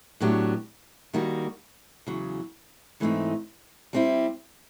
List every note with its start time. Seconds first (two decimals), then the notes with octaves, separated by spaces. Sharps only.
0.20 A2 F#3 B3 D4 G4
1.13 D#3 G3 A#3 D#4 F#4
2.07 E2 C#3 F#3
3.00 G#2 E3 A3 C4 D#4
3.93 G3 C4 E4